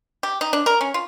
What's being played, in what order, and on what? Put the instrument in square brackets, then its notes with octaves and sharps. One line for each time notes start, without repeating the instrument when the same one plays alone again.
[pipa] G4
D#4
D4
A#4
C#4
F4